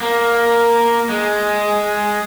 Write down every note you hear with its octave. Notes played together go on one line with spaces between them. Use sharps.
A#3
G#3